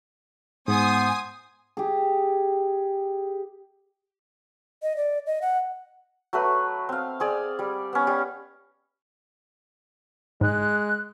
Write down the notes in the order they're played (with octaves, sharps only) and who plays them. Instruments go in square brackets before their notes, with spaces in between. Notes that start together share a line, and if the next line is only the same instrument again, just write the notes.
[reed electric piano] G#2 [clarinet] B3 [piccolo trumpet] C5 [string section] G#5 D#6
[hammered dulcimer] G4 G#4
[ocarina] D#5
D5
D#5
F#5
[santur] F#3 A3 B4
C4 F5
C4 G#4 D5
G3
B3 C#4
G3
[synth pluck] G#2 [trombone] G#3 [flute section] F#6